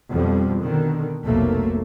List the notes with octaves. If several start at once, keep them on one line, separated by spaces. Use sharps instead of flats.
F2 B2 F3 G3
B2 D3 D#3
F1 B1 A3 A#3